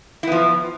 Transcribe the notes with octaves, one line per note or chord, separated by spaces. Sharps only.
F3 B3 E4